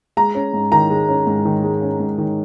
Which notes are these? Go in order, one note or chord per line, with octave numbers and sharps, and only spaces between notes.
G#3 A#5
C#4
G#2
D#3 A#5
G#3
C#4
G#2
D#3
G#3
C#4
G#2
D#3